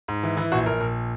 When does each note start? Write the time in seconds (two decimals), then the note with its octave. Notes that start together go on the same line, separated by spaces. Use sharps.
0.08 G#2
0.23 E3
0.37 E3 E4
0.52 A#1 F#4
0.66 A#1 A#4
0.81 A#1